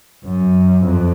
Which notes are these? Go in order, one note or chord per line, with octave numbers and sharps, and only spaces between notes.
F#2
F2